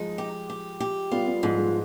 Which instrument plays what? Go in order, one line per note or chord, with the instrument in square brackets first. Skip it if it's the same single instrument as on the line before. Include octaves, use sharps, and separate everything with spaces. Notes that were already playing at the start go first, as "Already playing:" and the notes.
Already playing: [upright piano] F3 G#3 [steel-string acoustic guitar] D#4
[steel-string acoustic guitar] G4
G4
G4
[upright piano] G3 B3 [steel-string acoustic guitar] F4
[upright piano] G3 B3
[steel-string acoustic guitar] G#2 [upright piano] F3 G#3
[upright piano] F3 G#3